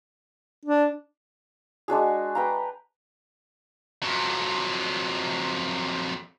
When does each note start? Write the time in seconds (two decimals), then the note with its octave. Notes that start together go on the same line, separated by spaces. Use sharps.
0.65 D4
1.88 G#3 D4 F#4 G#4
2.35 B4 G5 A#5
4.02 F2 F#3